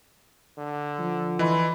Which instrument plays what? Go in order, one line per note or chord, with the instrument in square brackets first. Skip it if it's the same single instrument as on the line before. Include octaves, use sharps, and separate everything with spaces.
[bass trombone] D3
[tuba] F3
[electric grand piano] E3 [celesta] D#5 B5 C6